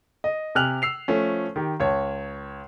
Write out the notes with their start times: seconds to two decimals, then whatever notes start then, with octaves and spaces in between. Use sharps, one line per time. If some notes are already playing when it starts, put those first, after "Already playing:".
0.24 D#5
0.55 C3 G4 G#5 F6 F#6 F7
0.82 E6 C7 F7
1.08 F3 A3 C#4
1.56 D#3 G4
1.80 C#2 C#5 A5